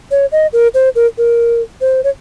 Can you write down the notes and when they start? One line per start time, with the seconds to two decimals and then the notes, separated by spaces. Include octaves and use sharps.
0.11 C#5
0.32 D#5
0.53 A#4
0.74 C5
0.95 A#4
1.18 A#4
1.81 C5
2.04 C#5